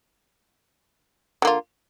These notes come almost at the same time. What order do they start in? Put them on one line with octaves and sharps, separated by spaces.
D3 A#3 F4